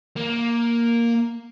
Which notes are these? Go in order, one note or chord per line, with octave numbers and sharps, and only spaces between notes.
A#3